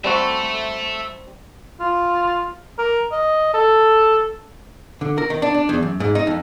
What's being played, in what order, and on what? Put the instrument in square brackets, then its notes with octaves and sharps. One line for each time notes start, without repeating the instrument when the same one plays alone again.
[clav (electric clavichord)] G3 C4 F#4 [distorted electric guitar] E5 A5
[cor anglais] F4
A#4
D#5
A4
[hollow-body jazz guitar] D3
A#4
D#3
D4
D4
E2
F#2
G#2
D#4
F2